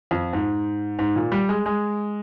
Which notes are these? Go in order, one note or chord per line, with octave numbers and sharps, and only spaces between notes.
F2
G#2
G#2
A#2
G3
G#3
G#3